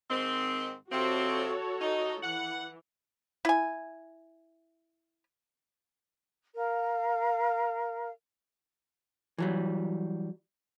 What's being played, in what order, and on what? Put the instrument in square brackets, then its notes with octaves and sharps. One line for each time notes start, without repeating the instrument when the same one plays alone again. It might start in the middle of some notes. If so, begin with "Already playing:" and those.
[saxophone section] G#2 D#3 C4
[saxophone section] C3 F3 C4 [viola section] F#4 A4 C#5
[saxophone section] D#4
[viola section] E3 [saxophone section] F#5
[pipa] E4 G#5
[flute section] A#4 F5
[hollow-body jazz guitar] E3 F#3 G3